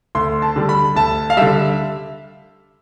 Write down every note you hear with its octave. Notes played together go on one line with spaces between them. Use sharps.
D2 C6
A5
D3 G3
B5
D2 A5
F5
D3 G3 E5